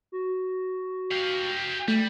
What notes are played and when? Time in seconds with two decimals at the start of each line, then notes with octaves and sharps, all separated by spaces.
0.12 F#4
1.12 G4 F5
1.88 G3 A3